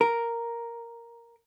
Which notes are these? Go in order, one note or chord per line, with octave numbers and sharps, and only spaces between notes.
A#4